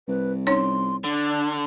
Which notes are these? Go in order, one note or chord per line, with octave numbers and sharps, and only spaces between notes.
C2 B4
C#4 D#4 C#5 C6
D3 D4